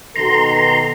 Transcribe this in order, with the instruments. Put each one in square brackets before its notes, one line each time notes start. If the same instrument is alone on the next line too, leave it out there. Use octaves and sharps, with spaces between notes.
[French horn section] B2 D#3 A4 [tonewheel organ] A#5 C6